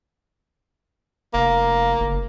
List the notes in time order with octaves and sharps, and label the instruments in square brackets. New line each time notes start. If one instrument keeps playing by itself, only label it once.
[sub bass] F1 [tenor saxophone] A#3
[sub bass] F#1